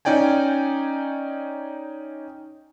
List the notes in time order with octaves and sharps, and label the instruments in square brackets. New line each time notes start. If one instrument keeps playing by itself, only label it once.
[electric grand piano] C#4 D#4 D5 G5 G#5